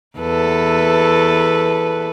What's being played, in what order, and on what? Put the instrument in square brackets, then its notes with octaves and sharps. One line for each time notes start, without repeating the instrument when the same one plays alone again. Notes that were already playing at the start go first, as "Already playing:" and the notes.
[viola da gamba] E2 A4 B4